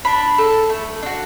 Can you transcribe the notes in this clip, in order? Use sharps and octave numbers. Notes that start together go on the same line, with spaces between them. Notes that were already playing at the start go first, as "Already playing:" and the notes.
D4 B5
A4
A3
D4 F#4